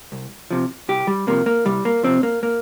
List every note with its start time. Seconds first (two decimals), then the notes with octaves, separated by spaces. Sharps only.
0.12 C2
0.50 C3 F3
0.89 C2 G4
1.07 G3
1.27 C3 F3 A#3
1.46 A#3
1.65 C2 G3
1.85 A#3
2.03 C3 F3 C4
2.23 A#3
2.43 A#3